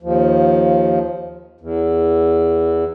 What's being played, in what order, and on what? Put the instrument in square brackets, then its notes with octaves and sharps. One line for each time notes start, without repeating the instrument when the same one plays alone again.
[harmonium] D#2 F3
E2